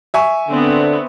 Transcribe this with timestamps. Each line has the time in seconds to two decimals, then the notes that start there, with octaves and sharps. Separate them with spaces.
0.14 E5 G#5 C#6
0.48 D3 B3 C4